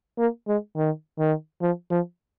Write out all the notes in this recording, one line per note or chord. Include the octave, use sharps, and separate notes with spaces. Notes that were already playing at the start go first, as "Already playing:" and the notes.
A#3
G#3
D#3
D#3
F3
F3